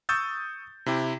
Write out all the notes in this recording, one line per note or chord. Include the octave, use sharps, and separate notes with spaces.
C#6 D#6 E6 G6 A6
C3 E4 G4